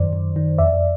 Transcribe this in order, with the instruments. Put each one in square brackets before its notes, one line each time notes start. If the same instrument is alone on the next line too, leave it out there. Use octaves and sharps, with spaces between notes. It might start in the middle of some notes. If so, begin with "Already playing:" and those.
Already playing: [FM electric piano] F#2 D#3 C5 D5
F#2
D#3
F2 D5 E5